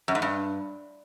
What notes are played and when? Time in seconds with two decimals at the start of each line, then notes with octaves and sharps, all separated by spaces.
0.08 F#2
0.15 G#2
0.22 G2